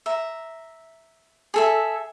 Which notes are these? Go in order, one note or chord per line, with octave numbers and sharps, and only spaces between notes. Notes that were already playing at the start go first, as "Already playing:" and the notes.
E5 A#5
G#4 A4 E5